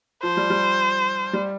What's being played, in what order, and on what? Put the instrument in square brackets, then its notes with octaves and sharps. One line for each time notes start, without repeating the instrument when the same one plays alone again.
[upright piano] F3 [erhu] C5
[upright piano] G3
G3
G3